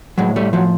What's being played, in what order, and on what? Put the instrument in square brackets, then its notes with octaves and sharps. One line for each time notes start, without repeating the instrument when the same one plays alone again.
[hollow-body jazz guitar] A2 F#3 G#3
G3 A3
F3 F#3